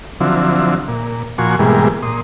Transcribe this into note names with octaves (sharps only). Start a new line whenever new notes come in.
D3 F3 F#3 C4 E4
A#2
A#2 F3 F#4 G#5 C6 C#6
G#2 B2 E3 G3 G#3 A#3
A#2 C6 D#6